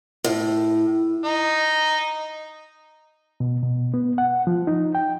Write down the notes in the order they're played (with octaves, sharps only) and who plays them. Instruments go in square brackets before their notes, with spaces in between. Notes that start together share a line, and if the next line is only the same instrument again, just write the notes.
[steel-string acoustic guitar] A2
[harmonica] D#4
[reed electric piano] B2
B2
B3
F#5
F3
D#4
G5